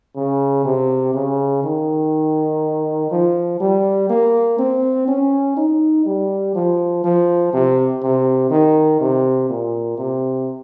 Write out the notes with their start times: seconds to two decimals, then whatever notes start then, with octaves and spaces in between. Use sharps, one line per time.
0.16 C#3
0.65 C3
1.14 C#3
1.64 D#3
3.11 F3
3.61 G3
4.10 A#3
4.58 C4
5.08 C#4
5.57 D#4
6.06 G3
6.55 F3
7.04 F3
7.53 C3
8.02 C3
8.50 D#3
9.01 C3
9.50 A#2
9.98 C3